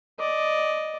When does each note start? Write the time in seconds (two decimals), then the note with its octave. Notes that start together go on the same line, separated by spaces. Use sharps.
0.20 D5 D#5